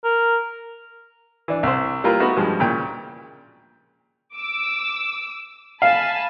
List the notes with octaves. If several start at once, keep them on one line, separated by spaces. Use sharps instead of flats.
A#4
E3 D4
C2 C5
G3 A#3 F4 A#4 B4
A3 B3 D#4 F#4
G2 F3 G3 G#3
A#2 C#3 G5
D6 E6
F5 G#5 A5 B5